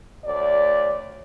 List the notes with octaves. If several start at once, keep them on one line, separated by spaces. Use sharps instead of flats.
D2 C#5 D5